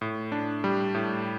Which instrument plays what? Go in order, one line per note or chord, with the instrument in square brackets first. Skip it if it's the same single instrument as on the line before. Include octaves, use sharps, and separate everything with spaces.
[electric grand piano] A2
D4
G3
A2